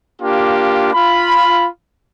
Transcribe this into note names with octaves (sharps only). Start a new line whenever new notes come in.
A#3 D4 F4 G4
F4 B5